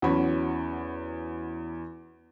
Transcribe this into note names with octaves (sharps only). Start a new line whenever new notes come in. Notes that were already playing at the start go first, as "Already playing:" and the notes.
E2 F#3 C#4 F#4 B5